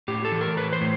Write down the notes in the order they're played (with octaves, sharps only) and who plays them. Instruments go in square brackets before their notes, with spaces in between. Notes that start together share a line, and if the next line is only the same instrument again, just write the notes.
[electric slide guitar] A2 G4
A4
E3
A#4
A2 B4
C5
A2